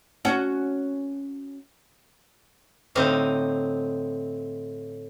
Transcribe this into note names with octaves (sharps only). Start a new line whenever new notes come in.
C#4 F#4
A2 D3 C4 D#4 F5